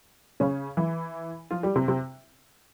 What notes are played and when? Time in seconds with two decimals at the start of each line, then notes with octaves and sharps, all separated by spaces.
0.40 C#3 C#4
0.77 E3 E4
1.51 F3 F4
1.63 G3 G4
1.76 C3 C4
1.88 C3 C4